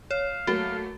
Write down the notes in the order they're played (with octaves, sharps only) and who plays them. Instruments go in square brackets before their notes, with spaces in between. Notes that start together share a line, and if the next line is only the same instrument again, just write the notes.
[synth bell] C#5 [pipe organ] F5
[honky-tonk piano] F#3 A3 A#3 [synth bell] F#4